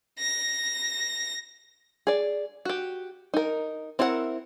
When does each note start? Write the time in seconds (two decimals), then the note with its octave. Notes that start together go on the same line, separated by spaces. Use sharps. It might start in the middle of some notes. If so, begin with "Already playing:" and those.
0.19 A#6
2.07 G#4 D5
2.65 F#4 G4
3.34 D#4 A#4
3.99 C4 E4 A#4 B4 F#5